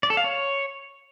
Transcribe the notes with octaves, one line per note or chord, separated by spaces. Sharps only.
D5
A4
F5
C#5